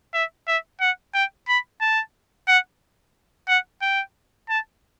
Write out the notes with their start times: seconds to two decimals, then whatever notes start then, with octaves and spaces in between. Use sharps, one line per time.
0.14 E5
0.47 E5
0.81 F#5
1.15 G5
1.49 B5
1.81 A5
2.48 F#5
3.48 F#5
3.82 G5
4.49 A5